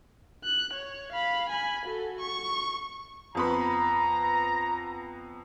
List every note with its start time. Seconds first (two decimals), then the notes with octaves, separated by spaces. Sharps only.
0.44 F#6
0.73 C#5
1.12 F5 B5
1.49 G#5 B5
1.85 F#4 A4
2.20 C#6
3.35 F2 B3 A#5 B5